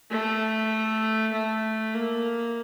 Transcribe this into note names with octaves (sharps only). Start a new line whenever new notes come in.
A3
A3
A#3